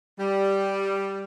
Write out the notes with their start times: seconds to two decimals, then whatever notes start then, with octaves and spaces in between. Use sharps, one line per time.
0.18 G3